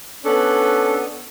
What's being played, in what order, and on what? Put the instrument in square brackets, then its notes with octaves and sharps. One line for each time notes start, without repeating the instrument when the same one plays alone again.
[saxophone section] B3 C#4 D4 A4